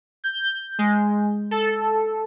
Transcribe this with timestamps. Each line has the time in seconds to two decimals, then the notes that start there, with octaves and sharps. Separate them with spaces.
0.24 G6
0.79 G#3
1.51 A4